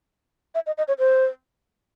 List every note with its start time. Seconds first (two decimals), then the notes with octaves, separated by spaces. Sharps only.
0.55 E5
0.67 D#5
0.78 D#5
0.88 C#5
0.99 C5